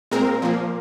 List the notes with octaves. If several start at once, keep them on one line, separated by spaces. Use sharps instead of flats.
A#2 G#3 C4 A#4
A#2 F3 A#3